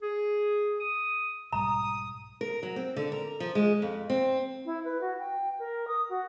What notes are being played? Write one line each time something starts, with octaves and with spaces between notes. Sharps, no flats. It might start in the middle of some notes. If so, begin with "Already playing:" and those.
G#4
D#6
B1 G#2 G3 A#5 D#6
A#4
F#3
C4
D3
A#4
F3
G#3
F2
C4
E4
B4
F#4
G5
A#4
D#6
F#4